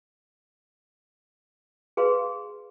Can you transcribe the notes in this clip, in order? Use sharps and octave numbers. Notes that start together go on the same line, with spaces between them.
G#4 B4 F5 C6